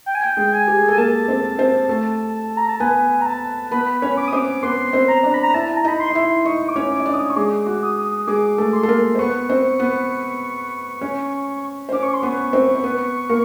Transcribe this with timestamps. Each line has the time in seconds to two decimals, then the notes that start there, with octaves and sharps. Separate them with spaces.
0.06 G5
0.15 G#5
0.23 G5
0.37 G#3 G#4
0.53 G#5
0.68 G4
0.79 G#4
0.88 A4 G#5
0.98 A#3 A#4 A5
1.28 C4 C5
1.59 C4 C5
1.89 A3 A4
2.57 A#5
2.69 A5
2.80 B3 B4 G#5
3.21 A#5
3.26 A5
3.71 B3 B4 B5
4.02 C#4 C#5
4.17 D6
4.28 C4 C5 D#6
4.37 D6
4.63 B3 B4 C6
4.93 C4 C5
5.08 A#5
5.23 D4 D5
5.34 B5
5.43 A#5
5.54 E4 E5 A5
5.77 A#5
5.84 D#4 D#5 B5
6.00 C6
6.10 D#5
6.15 E4 E5
6.45 D#4 D#5 C#6
6.68 D6
6.76 C#4 C#5
6.91 D6
6.99 D#5
7.06 D4 D5
7.13 D#6
7.30 C#6
7.36 G#3 G#4 D6
7.66 F#4
7.83 D#6
8.27 G#3 G#4 D6
8.58 A3 A4
8.73 C6
8.83 A4
8.88 A#3 A#4
9.15 C5
9.19 B3 B4 C#6
9.49 C4 C5
9.79 B3 B4
11.01 C#4 C#5
11.89 C5
11.92 C#4 C#5 D6
12.03 C#6
12.14 C6
12.23 B3 B4 C#6
12.53 C4 C5
12.75 C5
12.84 B3 B4
13.29 A#3 A#4